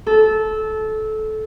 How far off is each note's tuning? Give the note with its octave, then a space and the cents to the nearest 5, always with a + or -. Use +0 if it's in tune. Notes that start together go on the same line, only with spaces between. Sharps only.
A4 -20